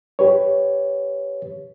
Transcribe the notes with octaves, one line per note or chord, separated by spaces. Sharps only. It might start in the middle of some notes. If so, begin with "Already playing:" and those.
G4 B4 C#5